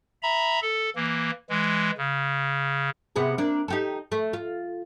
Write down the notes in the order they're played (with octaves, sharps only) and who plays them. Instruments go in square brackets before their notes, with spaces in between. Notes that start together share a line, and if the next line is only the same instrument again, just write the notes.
[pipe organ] E5 A#5 B5
A4
E3 A#3
E3 G#3
C#3
[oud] C3 B3 G#4
A#3 D4
D#4 G4 A4
A3
F4